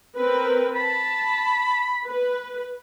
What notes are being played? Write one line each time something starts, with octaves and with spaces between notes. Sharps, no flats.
C4 A#4 B4
A5 B5
B4